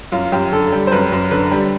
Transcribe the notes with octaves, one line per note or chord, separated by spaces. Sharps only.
F#2 F4
F#2 G4
D3 A4
G3
C5
F#2 B4
F#2
D3 B4
G3